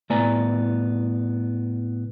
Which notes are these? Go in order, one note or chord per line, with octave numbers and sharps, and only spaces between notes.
C2 A2 B3 D5 G#5 A#5